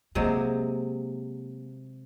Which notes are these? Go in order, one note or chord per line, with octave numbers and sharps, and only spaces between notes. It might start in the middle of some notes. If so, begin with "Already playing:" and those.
C3 F#3 G#3 A#3